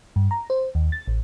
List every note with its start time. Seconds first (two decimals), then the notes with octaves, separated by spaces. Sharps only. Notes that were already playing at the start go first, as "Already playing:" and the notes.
0.16 G2
0.31 A#5
0.50 C5
0.75 D#2
0.92 A6
1.07 A1